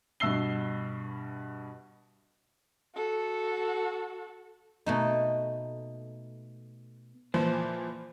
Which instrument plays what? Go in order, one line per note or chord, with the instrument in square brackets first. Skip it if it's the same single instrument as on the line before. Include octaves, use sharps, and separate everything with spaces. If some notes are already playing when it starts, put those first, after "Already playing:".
[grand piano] G2 B2 E5 E6 C7 G7
[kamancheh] F#4 A4
[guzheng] B2 A3 D#4
[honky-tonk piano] A#2 E3 F3 [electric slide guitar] C5 A5